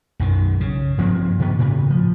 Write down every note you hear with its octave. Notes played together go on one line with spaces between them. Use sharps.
B1 F#2 D#3
C#3
G2 F3 A#3 C4
B2 D#3 B3
A2 C#3
F3